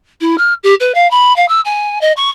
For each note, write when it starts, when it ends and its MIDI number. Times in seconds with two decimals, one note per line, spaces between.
0.21 0.36 64
0.38 0.53 89
0.63 0.74 67
0.80 0.92 71
0.94 1.09 77
1.11 1.35 83
1.36 1.48 77
1.48 1.60 88
1.65 2.01 80
2.01 2.12 75
2.16 2.29 85